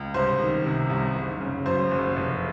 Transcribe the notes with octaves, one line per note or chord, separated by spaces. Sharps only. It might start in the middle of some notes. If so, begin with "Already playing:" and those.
Already playing: C#2
C2 C5
D#3
C3
C2
F#1
C#3
F#2 C5
F#1
F1